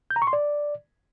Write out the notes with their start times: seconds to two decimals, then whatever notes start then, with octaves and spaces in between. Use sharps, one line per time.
0.10 G6
0.16 A#5
0.22 C#6
0.27 C6
0.33 D5